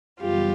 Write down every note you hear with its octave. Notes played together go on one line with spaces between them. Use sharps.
F#2 C#3 E3 G3 B3 F4 G4